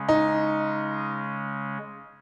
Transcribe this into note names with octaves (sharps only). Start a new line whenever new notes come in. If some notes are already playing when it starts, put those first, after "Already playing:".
Already playing: C#3 G#3 C#4
D#4